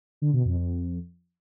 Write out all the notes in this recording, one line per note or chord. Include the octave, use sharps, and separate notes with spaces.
D3
B2
F2
F2